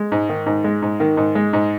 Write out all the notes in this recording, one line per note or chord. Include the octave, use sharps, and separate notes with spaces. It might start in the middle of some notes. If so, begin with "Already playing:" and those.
Already playing: G#3
G#2
D#3
G#2
G#3
G#2
D#3
G#2
G#3
G#2